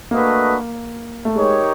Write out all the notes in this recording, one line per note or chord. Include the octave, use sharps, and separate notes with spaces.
A3 A#3 D4 F#4 B4 D#5
A3
G#3 D#4 G4 A#4 C#5